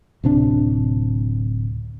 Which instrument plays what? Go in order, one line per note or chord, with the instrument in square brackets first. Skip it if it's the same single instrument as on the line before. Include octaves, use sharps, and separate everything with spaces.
[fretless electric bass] D1 C3 D4